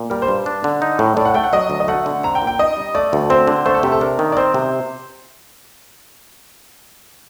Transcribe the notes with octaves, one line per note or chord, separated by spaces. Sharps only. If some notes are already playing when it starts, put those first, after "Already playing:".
Already playing: A#2
G3 A#4
C5
G2
D4
D3
D#4
A2
A2 D5
F#5
A3 G5
F#5
F#3 D#5
D2
D#5
A3 F#5
D3
C4 A#5
G5
A#2
G5
D#4 D#5
G3
A3 D5
D2
C4 C5
D3
A3 C5
A4
C3 G4
A4
D4 A#4
D#3
D5
C4 C5
C3